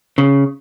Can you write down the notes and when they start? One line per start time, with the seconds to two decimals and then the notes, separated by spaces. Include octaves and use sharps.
0.18 C#3